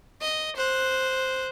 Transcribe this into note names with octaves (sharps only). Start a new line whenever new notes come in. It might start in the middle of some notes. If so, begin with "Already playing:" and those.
D#5
C5 F#6